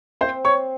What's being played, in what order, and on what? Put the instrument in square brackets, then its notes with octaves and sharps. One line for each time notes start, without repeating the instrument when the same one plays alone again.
[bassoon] C4 [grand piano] C5 C6
[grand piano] C#5 C#6